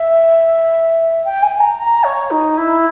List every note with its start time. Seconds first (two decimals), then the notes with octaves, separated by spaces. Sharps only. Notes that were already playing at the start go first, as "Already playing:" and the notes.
Already playing: E5
1.24 G5
1.42 G#5
1.60 A#5
1.78 A#5
2.04 C#5
2.30 D#4
2.57 E4